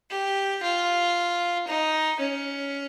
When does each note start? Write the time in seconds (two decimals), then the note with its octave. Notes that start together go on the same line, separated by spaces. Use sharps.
0.10 G4
0.63 F4
1.68 D#4
2.20 C#4